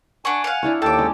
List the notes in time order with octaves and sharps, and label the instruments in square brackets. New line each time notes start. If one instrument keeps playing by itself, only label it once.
[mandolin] D4 F#5 C#6 [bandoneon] G#5
[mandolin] F5 F#5
[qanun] D4 E4 C#5
[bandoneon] D#2 A4 G5 [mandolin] A5 D6
[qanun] G#3 C#4